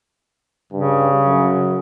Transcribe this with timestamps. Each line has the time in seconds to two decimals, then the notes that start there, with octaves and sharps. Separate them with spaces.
0.73 G2 C#3
1.26 F#2